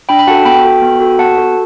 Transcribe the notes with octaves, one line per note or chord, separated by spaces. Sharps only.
D4 G5 B5
B5
F#4 A4 F#5 A5
B3 G5 B5
F#4 A4
B3
F#4 A4
B3 F#5 A5
F#4 A4